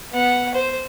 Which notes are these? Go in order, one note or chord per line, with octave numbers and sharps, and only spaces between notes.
B3 F#5
C5